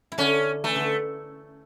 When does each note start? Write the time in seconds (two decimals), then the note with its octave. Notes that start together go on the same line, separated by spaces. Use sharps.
0.12 E4
0.18 D3 C#4 D4
0.64 E3 A3 E4
0.75 D3 D4